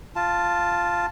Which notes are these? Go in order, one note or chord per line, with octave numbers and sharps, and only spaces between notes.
F4 A5